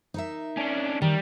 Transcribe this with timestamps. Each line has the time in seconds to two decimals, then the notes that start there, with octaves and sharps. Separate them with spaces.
0.14 D#4 A#4 E5
0.57 C#4 D4
1.02 D#3 G3